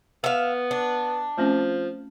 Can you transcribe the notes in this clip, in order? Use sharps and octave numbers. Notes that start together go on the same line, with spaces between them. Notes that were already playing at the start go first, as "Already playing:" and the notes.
B3 E5 F5
D4
F3 A3 C4 C#4